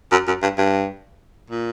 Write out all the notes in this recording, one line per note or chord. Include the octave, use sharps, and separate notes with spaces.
F#2
F#2
G2
G2
A#2